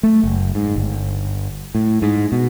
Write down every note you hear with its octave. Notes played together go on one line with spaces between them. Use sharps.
A3
F#1
G#2
G1
A2
G#2
B2